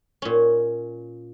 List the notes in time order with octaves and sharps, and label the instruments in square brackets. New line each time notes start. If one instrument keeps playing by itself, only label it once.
[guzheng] A#2 C#4